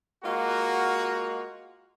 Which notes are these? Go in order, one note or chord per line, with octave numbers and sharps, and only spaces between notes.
G#3 A#3 F4 F#4